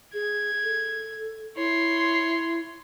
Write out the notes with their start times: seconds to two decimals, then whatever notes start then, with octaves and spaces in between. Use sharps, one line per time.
0.14 G#4 G#6
0.64 A4
1.57 E4 C#5 C6